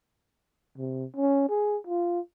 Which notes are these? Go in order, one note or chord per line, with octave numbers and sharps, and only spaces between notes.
C3
C#4
G#4
F4